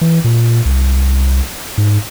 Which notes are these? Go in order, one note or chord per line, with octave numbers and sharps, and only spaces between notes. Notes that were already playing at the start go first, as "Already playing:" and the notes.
E3
A#2
C2
G#2